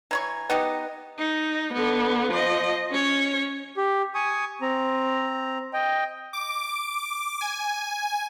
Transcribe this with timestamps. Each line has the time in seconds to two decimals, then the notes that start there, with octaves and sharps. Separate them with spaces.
0.11 E3 C#5 A#5 C#6 G#6
0.50 B3 D#4 G4 B4 D#5 D#6
1.18 D#4
1.73 D3 B3
2.31 F3 D#5
2.91 C#4 C#5
3.77 G4
4.15 G#5 C#6 D#6
4.61 C4 A#5
5.73 D#5 G5
6.33 D6
7.41 G#5